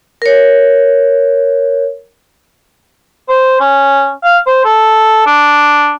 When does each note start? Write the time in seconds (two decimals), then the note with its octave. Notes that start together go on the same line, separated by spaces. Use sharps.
0.22 A#4 C#5
3.29 C5
3.60 C#4
4.24 F5
4.46 C5
4.64 A4
5.26 D4